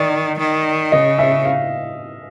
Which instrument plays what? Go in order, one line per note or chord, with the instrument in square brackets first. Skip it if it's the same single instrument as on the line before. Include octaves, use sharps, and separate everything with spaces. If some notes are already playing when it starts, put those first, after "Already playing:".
Already playing: [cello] D#3 [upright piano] D5
[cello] D#3
[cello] C#3 [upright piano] D#5
[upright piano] E5
F5